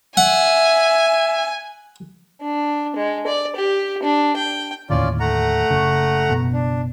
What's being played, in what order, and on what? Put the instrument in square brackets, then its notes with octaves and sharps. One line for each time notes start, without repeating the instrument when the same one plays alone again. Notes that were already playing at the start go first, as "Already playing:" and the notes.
[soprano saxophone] E5 [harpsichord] F#5 [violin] G#5
[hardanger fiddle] D4
G#3
D5
G4
D4
G5
[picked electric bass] D#2 A2 D3 [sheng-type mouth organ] C#4 F4 D5
[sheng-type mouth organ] A3 F#5 A#5
[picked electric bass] F#1 C#3
F#1 B2
[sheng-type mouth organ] D4